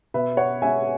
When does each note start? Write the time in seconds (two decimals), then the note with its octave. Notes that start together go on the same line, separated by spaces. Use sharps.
0.14 B2 B4 E5
0.37 C#5 F#5
0.62 G#3 C#4 E5 G#5